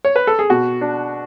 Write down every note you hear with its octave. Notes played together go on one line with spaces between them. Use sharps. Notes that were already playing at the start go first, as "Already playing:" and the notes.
C#5
B4
A4
G#4
B2 F#4
D4